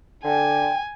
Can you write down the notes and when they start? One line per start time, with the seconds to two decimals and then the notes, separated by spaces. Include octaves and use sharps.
0.24 D3 G5 G#5